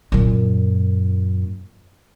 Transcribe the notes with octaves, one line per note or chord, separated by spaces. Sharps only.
F#2 A#2